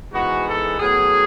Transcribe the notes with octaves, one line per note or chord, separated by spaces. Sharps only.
G#2 E3 G#3 B3 F#4
A4
A2 F#3 B3 G#4